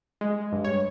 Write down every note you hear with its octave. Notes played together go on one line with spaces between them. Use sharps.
G#3
G2
C#5